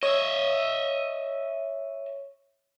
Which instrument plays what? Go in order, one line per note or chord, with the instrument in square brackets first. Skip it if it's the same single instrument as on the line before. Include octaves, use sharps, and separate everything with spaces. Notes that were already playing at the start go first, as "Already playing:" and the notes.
[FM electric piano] C#5 [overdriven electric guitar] D#5 E5